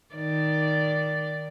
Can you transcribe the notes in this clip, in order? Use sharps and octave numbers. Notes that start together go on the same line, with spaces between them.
D#3 D5